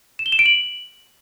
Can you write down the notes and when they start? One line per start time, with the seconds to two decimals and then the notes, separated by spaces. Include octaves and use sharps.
0.19 E7
0.26 G7
0.32 E7
0.39 D7
0.46 F#7